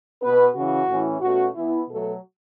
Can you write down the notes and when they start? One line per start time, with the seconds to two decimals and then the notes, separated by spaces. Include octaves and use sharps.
0.21 B2 B3 B4
0.55 C#3 E3 C#4 F#4
0.88 A2 E3 C#4
1.21 B2 A3 C#4 F#4
1.55 E3 B3 E4
1.88 B2 F#3 A3 A4